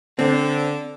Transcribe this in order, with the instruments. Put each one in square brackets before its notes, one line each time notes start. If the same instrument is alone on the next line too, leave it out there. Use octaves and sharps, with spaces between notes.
[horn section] D3 [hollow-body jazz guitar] C4